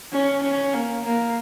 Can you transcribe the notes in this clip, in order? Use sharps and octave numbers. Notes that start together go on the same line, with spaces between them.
C#4
C#4
A#3
A#3